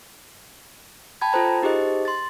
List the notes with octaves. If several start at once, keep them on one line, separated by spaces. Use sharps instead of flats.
G5 A5 B5 G#6
F4 A4 C5 A#5
D#4 G4 G#4 C5 D#5
C6 A6